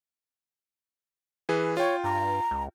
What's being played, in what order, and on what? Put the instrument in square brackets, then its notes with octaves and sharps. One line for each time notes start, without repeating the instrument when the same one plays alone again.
[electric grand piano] E3 G#4 B4
[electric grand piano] F4 G5 [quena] C#5
[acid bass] G2 [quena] A#5
[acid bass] C#2